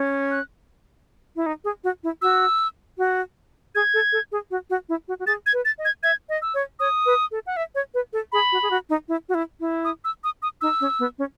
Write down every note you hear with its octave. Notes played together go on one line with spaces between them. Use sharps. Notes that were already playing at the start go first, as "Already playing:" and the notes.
Already playing: C#4
F#6
E4
D#4
G#4
F#4
E4
F#4 E6
F#4
G#4 G#6
A4
A4
G#4
F#4
F#4
E4
F#4
F#4
G#4 A6
G#6
B4
A6
D#5
G#6
E5 G#6
D#5
E6
C#5
C#5 D#6
B4
A4
F#5
E5
C#5
B4
A4
G#4 B5
F#4
G#4
F#4
D#4
E4
F#4
E4
E4
D#6
E6
D#6
D#6
D#4 E6
C#4
B3
C#4